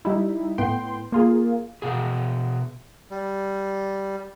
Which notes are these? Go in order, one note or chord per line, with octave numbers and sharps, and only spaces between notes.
G3 D#4 E4
A2 B3 G5 C6
A#3 F4 G#4
B2 G#4
G3